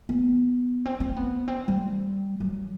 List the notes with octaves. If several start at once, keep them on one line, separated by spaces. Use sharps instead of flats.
B3
C4
C4
B3
C4
G3
F#3